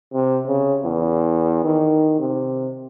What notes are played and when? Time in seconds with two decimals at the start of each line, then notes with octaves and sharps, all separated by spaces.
0.14 C3
0.47 C#3
0.84 E2
1.64 D#3
2.20 C3